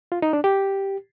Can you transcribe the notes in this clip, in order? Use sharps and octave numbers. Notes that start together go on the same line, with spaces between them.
F4
D#4
D4
G4